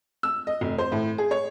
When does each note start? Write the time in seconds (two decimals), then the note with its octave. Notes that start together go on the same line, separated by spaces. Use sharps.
0.23 E6
0.47 D#5
0.61 F1
0.78 C5
0.92 A2
1.18 G#4
1.31 C#5